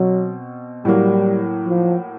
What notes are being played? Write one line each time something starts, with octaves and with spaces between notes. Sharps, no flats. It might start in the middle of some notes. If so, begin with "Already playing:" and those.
Already playing: B2 F#3 C4
A2 F#3 G3 A#3
F3